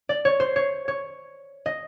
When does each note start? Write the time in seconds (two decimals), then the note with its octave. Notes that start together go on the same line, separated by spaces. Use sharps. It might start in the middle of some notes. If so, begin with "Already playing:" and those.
0.09 D5
0.25 C#5
0.40 C5
0.56 C#5
0.88 C#5
1.66 D#5